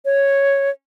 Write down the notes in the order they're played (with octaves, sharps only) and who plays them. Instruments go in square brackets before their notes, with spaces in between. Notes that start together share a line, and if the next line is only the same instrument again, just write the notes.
[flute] C#5